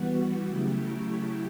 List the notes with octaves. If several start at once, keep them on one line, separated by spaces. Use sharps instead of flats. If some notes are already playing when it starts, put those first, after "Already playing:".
Already playing: E3 G3 B3 F#4
C#3 F#3 A3 E4 G4